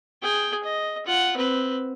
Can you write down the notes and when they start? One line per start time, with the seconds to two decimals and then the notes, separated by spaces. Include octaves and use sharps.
0.22 G#4 G5
0.63 D#5
1.06 F4 F#5
1.37 C4 B4